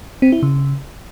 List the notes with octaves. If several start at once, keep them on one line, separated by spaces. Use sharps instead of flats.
C4
E4
C#3